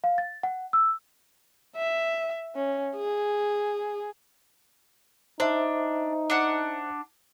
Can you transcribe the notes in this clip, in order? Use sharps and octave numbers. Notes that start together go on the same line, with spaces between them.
F5
A6
F#5
E6
E5
C#4
G#4
D4 D#4 C5 E5
D4 F#5